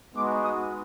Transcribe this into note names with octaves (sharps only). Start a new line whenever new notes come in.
G#3 B3 D#4 F#4 D6
D#6